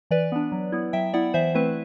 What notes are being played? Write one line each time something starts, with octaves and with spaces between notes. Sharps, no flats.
E3 B4 D5
B3 D4
F#3
B3 E4
F#3 E5 G5
B3 E4 D5 F#5
E3 C5 E5
A3 C4 E4 B4